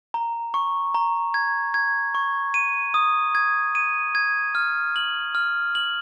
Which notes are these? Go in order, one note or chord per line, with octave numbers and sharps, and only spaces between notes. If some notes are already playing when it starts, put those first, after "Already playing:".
A#5
C#6
A#5
G#6
G#6
C#6
D#7
D#6
G#6
D#7
G#6
F6
F#7
F6
F#7